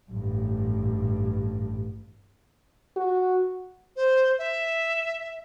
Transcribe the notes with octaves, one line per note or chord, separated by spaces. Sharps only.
A1 G2
F#4
C5
E5